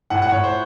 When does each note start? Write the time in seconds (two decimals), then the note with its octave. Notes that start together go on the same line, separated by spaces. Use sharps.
0.10 A2 F#5
0.22 F#5
0.32 A2 C#5
0.44 C5